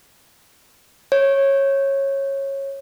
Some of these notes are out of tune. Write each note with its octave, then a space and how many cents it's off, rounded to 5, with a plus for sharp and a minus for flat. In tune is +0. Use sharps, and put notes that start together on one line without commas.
C#5 -15